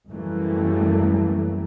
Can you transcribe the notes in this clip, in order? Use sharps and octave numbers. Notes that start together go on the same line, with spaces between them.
F#2 E3 G3 A3 A#3